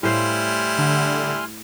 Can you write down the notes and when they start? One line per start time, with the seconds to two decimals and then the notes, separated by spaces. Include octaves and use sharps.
0.03 A2 G3 E4 C5 F5 G#5 C6 F6
0.78 D3